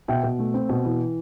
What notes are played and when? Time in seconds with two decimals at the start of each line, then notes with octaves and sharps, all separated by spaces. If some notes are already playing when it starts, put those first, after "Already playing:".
0.08 B2 E5 G5
0.23 B2
0.39 A3
0.54 C4
0.69 B2
0.85 E3